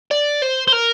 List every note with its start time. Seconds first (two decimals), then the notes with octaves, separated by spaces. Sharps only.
0.11 D5
0.42 C5
0.67 C5
0.72 A#4